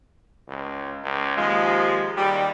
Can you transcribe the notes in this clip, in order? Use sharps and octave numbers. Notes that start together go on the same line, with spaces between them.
C#2
C#2
D#2 F3 G#3
D#2 G3